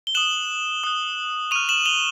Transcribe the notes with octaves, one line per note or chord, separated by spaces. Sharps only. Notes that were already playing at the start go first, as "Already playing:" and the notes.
G7
D#6 F#6 E7 F#7
D#6 F#6
C#6 F6 D#7 F7
E7 F#7
F7 G7